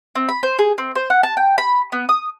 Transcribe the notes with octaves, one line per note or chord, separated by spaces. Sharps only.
C4
B5
C5
G#4
C4
C5
F#5
A5
G5
B5
B3
D#6